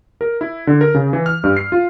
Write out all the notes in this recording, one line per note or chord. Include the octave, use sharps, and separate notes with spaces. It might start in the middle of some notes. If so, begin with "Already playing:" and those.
A#4
E4
D3
A#4
C#3
E3
F6
G2
C7
F4